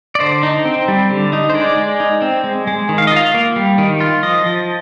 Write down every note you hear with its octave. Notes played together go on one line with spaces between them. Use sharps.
D5
D3 C5
D#4
C4
G3
D3
D#4
C5
G#3 D5
G#3
D#4
C4
G#3
G#3
D#3
F5
D#5
F4 F5
A#3
G3
D#3
F4
F3 D#5
F3